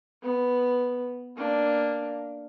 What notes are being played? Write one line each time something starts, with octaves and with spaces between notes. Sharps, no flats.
B3
A#3 D4